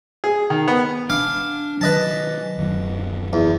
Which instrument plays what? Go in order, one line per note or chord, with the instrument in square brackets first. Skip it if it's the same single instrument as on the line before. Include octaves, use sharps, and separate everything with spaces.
[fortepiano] G#4
D#3
B3
[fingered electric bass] D4 [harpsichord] F5 G#5 D6
[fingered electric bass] D#3 F#3 [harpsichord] B4 D#5 A5
[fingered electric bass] D1 F#2 D#3
[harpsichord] E2